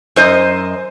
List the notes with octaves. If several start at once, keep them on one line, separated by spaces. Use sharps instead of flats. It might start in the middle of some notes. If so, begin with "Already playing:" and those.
F#2 C5 D#5